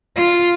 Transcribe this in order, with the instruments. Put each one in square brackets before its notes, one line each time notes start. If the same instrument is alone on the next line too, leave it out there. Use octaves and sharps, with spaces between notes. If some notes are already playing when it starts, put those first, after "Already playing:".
[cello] F4